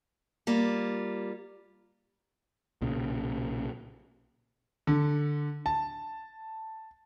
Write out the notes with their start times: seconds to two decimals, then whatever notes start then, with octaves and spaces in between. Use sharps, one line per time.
0.47 G3 A#3 F4
2.82 B1 A#2 C#3
4.87 D3
5.66 A5